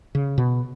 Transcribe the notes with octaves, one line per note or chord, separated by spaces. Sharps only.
C#3
B2